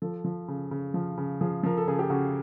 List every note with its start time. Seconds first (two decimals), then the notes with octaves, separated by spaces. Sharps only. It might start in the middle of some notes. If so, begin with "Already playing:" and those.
0.02 F3 A4
0.25 F3
0.48 C#3
0.71 C#3
0.94 F3
1.18 C#3
1.41 F3 G#4
1.63 F3 A#4
1.77 A4
1.88 C#3 G#4
1.99 G4
2.10 C#3 F#4